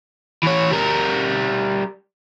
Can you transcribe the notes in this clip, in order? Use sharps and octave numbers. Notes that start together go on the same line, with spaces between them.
E3 C#5
G3 A#4